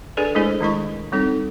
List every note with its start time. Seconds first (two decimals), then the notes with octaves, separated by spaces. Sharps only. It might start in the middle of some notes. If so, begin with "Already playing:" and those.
0.17 D4 G#4 A4 B4 D5
0.35 G#3 A3 D4 E4 G#4 C5
0.61 D#3 G#3 E4 C#6
1.12 G3 C4 D#4 A4